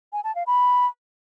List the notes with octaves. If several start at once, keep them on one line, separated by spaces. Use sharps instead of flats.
G#5
A5
F5
B5